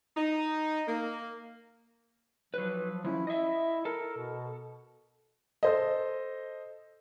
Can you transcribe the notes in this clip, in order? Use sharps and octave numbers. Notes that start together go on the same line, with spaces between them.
D#4
A#3
F3 F#3 B4
F3 C#4 E4
E4 D#5 E5
A4 A#4
B2
A4 C5 D#5